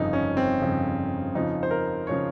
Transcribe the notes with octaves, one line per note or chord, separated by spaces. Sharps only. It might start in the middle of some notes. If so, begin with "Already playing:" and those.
Already playing: G1 F2 C#3 D#4
C#4
C4
G1 F2 C#3
F2 C#3 F3 D#4
C5
A#4
C#3 F3 C#5